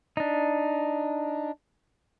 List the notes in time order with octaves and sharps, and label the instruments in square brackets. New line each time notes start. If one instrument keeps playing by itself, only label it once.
[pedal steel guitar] D4 D#4